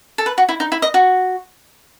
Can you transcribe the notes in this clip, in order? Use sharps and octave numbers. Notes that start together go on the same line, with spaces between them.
A4
B4
F#4
E4
D#4
E4
D#5
F#4